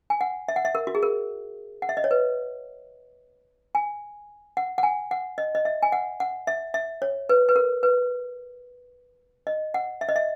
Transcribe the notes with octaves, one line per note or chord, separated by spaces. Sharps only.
G#5
F#5
E5
F#5
E5
A#4
F#4
G#4
A#4
F#5
E5
D#5
C#5
B4
G#5
F#5
F#5
G#5
F#5
D#5
D#5
E5
G#5
F#5
F#5
E5
E5
C#5
B4
B4
A#4
B4
D#5
F#5
E5
D#5
E5